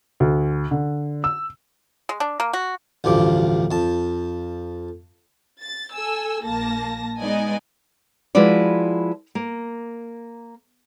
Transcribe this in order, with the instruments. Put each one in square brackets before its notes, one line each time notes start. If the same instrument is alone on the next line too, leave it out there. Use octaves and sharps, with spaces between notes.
[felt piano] D2
D3
E6
[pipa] G#3
D4
A#3
F#4
[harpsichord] A1 D2 G2 F3 D6
F2 A5
[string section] A6
A4 G#5 E6
A#1 A#3 A5 A#6
G#3 B3 D#4 D5 D#5 G#5
[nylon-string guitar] F3 G#3 E4 F#4 B4 D5
A#3